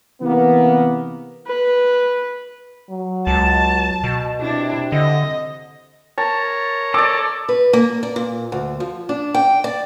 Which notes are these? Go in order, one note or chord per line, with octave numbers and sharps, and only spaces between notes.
C3 E3 A#3 B3
B4
F#3
C#2 A5
B2
C3 D4 E4
D3 D#5
A#4 C#5 A5
A4 D5 D6
B4
A#3
D5
A#2
D2
F3
D4
G5
D5